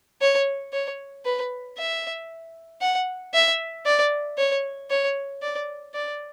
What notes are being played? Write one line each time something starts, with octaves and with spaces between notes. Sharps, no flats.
C#5
C#5
B4
E5
F#5
E5
D5
C#5
C#5
D5
D5